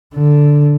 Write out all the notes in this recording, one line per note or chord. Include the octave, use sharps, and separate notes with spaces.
D3